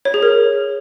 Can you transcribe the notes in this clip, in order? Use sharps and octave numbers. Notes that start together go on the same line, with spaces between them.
C#5
G#4
A#4